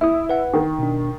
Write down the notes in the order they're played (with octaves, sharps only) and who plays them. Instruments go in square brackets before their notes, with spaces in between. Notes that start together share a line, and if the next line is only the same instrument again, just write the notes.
[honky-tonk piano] E4 [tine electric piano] E5 D#6
[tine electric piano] B4 F#5
[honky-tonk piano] D#3
[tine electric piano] B2 D4